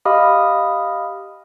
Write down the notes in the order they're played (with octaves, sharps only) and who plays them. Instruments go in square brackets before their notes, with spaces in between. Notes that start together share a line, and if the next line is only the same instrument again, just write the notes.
[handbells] G4 D#5 F5 B5 D#6 F6